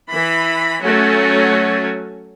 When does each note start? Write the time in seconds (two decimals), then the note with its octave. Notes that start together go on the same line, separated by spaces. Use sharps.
0.12 E3 B5
0.83 F#3 A3 C#4 F#4